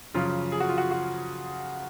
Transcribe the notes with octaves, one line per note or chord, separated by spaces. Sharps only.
F#2 C#3 F3 F4
G#4
F#4
F4
F#4
F#4